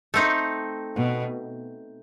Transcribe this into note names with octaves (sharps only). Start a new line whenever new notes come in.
A3 C4 D#4
B2